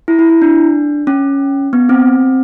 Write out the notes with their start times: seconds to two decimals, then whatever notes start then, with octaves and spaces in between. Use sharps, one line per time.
0.08 E4
0.19 E4
0.30 E4
0.42 D4
1.07 C#4
1.73 B3
1.89 C4